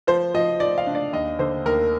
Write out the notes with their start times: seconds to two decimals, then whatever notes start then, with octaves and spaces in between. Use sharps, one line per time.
0.07 F3 C5
0.34 F3 D#5
0.60 F3 D5
0.78 F5
0.87 D4
0.95 D5
1.13 D#2 D#5
1.39 D3 C5
1.65 D#2 A#4